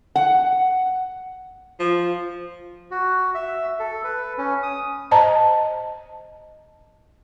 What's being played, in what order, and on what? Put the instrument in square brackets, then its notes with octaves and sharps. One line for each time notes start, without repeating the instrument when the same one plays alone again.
[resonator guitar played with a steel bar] F#5
[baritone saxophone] F3
[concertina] F#4
E5
A4
B4
C#4
D#6
[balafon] C5 D#5 A5 A#5